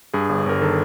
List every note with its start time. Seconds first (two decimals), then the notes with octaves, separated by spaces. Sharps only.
0.13 G2 G#4
0.29 G1
0.46 G1 A#4
0.61 D#3 A4